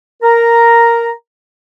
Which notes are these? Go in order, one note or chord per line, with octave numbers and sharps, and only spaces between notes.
A#4 A#5